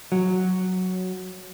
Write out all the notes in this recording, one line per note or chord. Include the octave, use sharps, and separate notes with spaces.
F#3